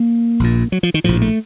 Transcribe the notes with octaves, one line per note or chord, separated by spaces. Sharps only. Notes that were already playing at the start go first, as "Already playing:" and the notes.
Already playing: A#3
A#1 A#2
F#3
F3
D#3
A#1 A2 F3
A3